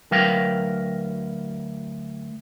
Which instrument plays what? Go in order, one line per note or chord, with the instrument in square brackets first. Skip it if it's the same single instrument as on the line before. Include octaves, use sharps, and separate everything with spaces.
[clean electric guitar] D2 F#3 A#4 B4 F5 G5